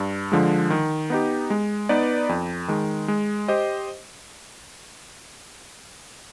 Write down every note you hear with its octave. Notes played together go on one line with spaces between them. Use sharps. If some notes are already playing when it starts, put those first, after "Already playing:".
Already playing: G2
D3 F3 G#3
D#3
B3 D#4 G4
G#3
B3 D#4 B4 D5
F2
D#3 G#3
G#3
G4 C5 D#5